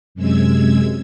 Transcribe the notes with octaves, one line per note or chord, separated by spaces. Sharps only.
F#2 C3 G#3 E6 G#6